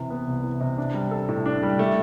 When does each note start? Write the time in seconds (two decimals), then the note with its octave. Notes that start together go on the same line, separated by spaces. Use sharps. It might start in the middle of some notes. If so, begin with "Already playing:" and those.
Already playing: C3 E3
0.10 B3
0.27 C2
0.44 E3
0.60 C3
0.78 D4
0.94 G3
1.11 A4
1.28 A2
1.46 D4
1.63 G3
1.79 A3